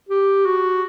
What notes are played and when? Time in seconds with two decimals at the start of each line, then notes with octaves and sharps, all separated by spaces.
0.09 G4
0.46 F#4